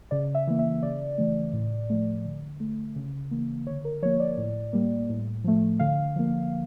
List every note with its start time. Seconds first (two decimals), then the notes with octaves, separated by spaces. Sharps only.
0.11 C#3 D5
0.35 E5
0.47 E3 A#3
0.59 E5
0.83 C#3 D5
1.18 E3 A3
1.53 A2
1.90 F3 A3
2.25 D3
2.60 A3
2.96 C#3
3.31 E3 A#3
3.67 D3 C#5
3.85 A#4
4.03 F3 C#5
4.05 A#3
4.20 D5
4.37 A2
4.73 G3 A#3
5.09 A2
5.44 F3 A3
5.79 D3 F5
6.16 F3 A#3